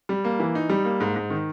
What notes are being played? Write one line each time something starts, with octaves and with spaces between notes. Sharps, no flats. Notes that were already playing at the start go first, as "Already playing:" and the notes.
G3
A#3
E3
D#4
G3
A#3
G#2
G#2
D#3